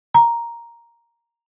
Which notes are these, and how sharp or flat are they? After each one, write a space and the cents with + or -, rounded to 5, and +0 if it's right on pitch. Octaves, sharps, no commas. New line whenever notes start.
A#5 +5